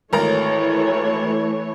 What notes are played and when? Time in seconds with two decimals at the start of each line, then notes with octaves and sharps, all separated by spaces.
0.13 G#1 E3 A3 A#4 C#5 A#5